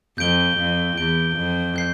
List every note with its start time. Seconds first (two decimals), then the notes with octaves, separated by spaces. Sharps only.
0.18 F2 G6 D7 G7
0.57 F2
0.97 E2 G6 D7 G7
1.36 F2
1.76 G6 C7